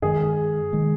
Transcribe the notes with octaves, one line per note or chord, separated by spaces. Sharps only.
G2 D#3 G#3 G#4
D#3 G#3